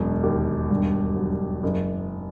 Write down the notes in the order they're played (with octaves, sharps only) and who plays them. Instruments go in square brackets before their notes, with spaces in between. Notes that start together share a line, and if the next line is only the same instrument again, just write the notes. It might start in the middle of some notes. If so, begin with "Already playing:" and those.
Already playing: [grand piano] E1 F#2
D#2
G2
F#3
F#1